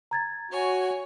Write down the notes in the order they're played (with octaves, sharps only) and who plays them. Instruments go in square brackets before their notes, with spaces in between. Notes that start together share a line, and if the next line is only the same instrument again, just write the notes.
[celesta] A#5 G#6 A6
[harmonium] F#4 [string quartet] C#5 G#5